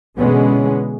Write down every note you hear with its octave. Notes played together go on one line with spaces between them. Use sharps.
B2 D3 E3 G#3 B3 C#4